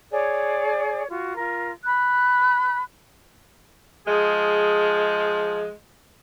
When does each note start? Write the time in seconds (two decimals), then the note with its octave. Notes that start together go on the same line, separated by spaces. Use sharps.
0.11 G#4 C#5 D5
1.09 F4 F#4
1.35 F4 A#4
1.84 B5 F#6
4.07 F3 G#3 G#4